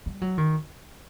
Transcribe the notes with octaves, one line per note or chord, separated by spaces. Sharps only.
G3
F#3
D#3